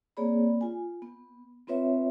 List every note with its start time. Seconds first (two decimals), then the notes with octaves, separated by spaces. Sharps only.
0.17 A#3 C4 G#4 C#5 D5 B5
0.61 F4 G#5
1.02 B3
1.67 B3 C4 F4 B4 C#5 E5